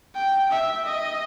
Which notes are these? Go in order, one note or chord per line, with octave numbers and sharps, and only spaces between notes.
G5
E5
D#5